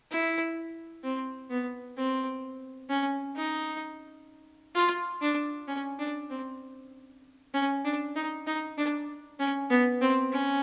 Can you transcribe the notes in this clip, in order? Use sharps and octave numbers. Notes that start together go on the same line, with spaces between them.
E4
C4
B3
C4
C#4
D#4
F4
D4
C#4
D4
C4
C#4
D4
D#4
D#4
D4
C#4
B3
C4
C#4